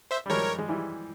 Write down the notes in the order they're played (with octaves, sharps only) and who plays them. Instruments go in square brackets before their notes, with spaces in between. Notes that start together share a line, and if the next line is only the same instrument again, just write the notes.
[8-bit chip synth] C5 E5
[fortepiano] G3
[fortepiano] F3 G#3 [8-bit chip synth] A#4 C#5
[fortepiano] G#3
E3 G3